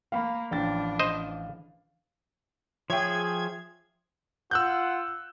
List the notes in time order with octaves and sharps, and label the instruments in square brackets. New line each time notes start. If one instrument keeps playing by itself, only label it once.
[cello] A#3 [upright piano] F5 B5
[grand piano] A1 G5 A6 [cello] F3 D4
[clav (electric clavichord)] C5 D#5
[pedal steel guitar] F3 G#4 [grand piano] C#5 E5 G5 [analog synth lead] G#6
[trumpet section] F4 F#5 [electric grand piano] E6 F#6 G6